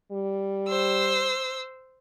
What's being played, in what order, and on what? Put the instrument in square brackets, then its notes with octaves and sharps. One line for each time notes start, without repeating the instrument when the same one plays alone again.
[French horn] G3
[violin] C5 E6